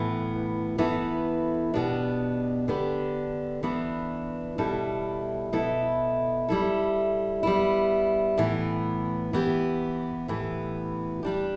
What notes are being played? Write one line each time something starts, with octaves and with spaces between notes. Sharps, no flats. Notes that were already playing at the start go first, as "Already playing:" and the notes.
Already playing: A2 E3 B3
E3 B3 E4 A4
B2 B3 D4 G4
D3 B3 D4 G4
E3 B3 D4
B2 G3 E4 A4
B2 B3 E4 A4
G3 E4 A4
G3 B3 E4
A2 E3 B3
E3 B3 G4
A2 E3 B3
G3 D4 G4